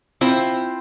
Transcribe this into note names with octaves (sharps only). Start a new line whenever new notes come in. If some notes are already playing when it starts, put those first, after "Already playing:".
C4 E4 F4 C5